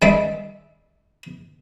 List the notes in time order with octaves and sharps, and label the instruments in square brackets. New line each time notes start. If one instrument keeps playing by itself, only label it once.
[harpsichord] D#3 G3 G#3 D5 E5